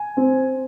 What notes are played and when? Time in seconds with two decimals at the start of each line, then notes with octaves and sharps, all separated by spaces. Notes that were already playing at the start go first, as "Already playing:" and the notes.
Already playing: G#5
0.17 C4